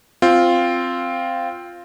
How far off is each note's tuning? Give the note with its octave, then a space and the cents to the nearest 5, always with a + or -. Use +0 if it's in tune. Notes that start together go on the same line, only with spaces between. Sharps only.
C4 +0 F4 +0